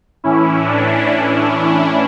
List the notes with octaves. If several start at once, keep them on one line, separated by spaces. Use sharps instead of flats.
A2 E3 C#4 E4
D4
D4